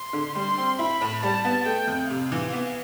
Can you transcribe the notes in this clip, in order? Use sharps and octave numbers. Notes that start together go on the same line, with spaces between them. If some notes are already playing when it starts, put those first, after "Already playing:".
Already playing: C6
D3
G3 C6
C4
E4 B5
A2
G3 A5
B3
A3 G5
F2
C3 F5
E3
B3